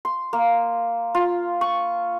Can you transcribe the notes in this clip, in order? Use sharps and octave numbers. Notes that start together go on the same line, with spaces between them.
C6
A#3
F4
C#6